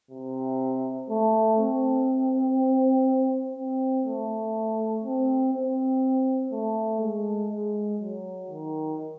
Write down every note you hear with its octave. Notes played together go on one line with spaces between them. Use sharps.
C3
A3
C4
C4
A3
C4
C4
A3
G#3
G#3
F#3
D#3